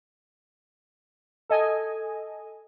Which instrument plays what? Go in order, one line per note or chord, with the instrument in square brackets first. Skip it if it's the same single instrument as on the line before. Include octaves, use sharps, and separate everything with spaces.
[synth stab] A4 D#5 G#5